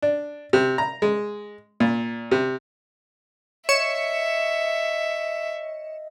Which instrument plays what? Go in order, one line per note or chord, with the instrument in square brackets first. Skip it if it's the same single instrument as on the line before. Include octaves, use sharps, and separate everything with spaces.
[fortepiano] D4
C3
A#5
G#3
A#2
C3
[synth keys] C#5 C#7 E7 [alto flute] D#5 [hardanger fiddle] E5